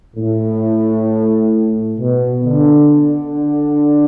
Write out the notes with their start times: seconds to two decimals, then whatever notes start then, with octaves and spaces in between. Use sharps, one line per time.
0.16 A2
1.99 B2
2.45 D3